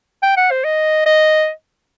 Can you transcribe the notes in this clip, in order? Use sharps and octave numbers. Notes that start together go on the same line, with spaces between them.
G5
F#5
C5
D#5
D#5